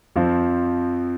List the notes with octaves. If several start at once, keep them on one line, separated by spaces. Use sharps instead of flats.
F2 F3 C4